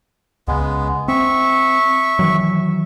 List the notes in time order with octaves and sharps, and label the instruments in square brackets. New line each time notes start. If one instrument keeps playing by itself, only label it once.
[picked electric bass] C#2 C#3 [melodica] G#3 B3
[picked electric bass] C4 [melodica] E5 C#6
[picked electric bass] D#3 E3 F#3